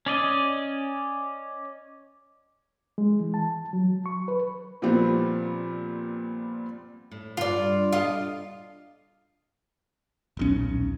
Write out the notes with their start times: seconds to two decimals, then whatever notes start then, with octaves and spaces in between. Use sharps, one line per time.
0.06 C#4 D5 D#5
2.98 G#3
3.20 E3
3.34 A5
3.73 F#3
4.06 C#6
4.28 B4
4.82 A#2 F3 G3 B3 C4
7.12 A2
7.37 G2 F4 D5
7.92 A#2 F4 A4 D#5 F5
10.37 D#1 B1 C#4